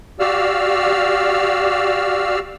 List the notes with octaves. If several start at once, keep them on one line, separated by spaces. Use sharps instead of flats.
F#4 G4 D5 F5 E6 F6